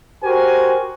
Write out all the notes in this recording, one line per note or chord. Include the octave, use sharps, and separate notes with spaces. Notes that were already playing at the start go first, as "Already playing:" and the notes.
F#4 G4 A#4 C5 G#5